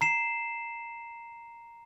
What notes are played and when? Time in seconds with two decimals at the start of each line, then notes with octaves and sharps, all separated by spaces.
0.01 A#5 C7 E7